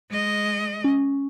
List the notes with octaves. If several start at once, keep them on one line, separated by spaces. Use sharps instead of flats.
G#3 D#5
C#4